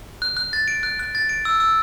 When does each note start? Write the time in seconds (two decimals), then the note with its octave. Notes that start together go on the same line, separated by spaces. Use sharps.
0.22 F#6
0.37 F#6
0.53 A6
0.68 D7
0.83 F#6
0.99 F#6
1.15 A6
1.29 D7
1.45 E6
1.60 E6